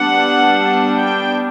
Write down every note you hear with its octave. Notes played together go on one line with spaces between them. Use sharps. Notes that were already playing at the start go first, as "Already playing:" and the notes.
Already playing: G3 B3 D4 F#5
G5